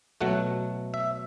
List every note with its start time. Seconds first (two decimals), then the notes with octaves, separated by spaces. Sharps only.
0.21 B2 F#3 A3 F#5
0.94 E5